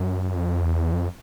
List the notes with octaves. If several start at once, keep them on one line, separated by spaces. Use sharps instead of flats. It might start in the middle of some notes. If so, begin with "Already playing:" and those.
Already playing: F#2
F2
E2
F2